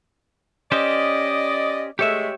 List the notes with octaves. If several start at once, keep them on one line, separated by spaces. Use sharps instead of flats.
C#4 G4 C5 D5 D#5
G#3 A3 G4 C#5 E5